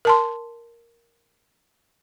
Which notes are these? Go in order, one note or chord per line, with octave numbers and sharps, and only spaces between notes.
A#4 A5 C6